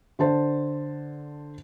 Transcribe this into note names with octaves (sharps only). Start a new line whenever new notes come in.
D3 C5 A5